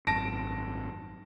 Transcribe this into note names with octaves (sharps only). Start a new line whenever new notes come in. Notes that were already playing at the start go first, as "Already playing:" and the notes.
G#1 F#2 A5 A#6 D7